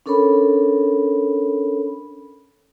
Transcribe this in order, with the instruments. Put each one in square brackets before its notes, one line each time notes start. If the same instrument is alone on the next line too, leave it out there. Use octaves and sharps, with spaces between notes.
[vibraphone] C#4 D4 A4 A#4 C#5 B5